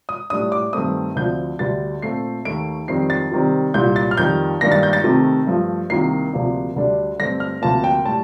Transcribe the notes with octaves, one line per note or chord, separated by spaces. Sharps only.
D#6
A2 G3 D4 D#6
D6
G2 D#3 A3 C4 D#6
D2 D3 F3 C4 G6
D2 D3 G3 A6
A#2 A3 C4 C7
D#2 D#3 A3 D7
F2 D#3 G3 C4 C7
A6
C3 D#3 G3 C4
C2 A#2 G3 G6
A6
F6
F2 D#3 G3 G6
G2 D#3 A#3 D4 A#6
A6
G6
A6
C3 D#3 A3 C4
G2 F3 A3
C2 C3 D#3 A#3 C7
D2 C3 F3 A#3 D4
D2 D3 G3 D4
G2 D3 A3 C4 A#6
F6
D2 C3 F3 A#3 A5
G5
A2 G3 A5